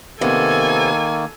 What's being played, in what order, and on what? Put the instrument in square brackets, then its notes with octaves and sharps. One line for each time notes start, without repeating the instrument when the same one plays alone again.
[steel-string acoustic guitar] C3 B3 [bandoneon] D#3 A#3 [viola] A4 G#5